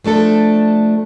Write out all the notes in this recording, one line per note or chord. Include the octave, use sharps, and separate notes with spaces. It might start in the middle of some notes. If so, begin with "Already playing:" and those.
F3 A3 D4 A4